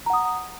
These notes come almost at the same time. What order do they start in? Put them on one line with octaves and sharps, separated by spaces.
A#5 F#5 D#6